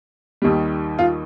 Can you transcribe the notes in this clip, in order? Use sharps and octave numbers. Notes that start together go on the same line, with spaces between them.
D#2 D#3 G3
F4